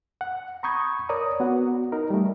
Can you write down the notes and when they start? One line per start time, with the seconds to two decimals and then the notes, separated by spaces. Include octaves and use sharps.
0.21 F#5
0.63 A#5 B5 C#6 D#6 G6 G#6
1.09 A#4 C#5 D5 A#5 D#6
1.40 B3 F#4 F#5
1.92 D#4 A#4
2.10 G3 A3